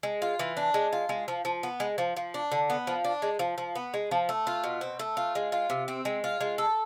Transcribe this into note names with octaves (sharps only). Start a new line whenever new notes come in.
G#3
F4
E3
D4
G#3
F4
G#3
F3
F3
B3
G#3
F3
F3
D4
D3
B3
F3
D4
G#3
F3
F3
B3
G#3
F3
A3
F4
B2
C4
A3
F4
G#3
F4
C3
C4
G#3
F4
G#3
A4